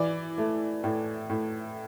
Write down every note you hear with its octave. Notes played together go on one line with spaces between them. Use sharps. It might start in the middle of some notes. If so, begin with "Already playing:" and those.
Already playing: E3 D5
A3
A2
A2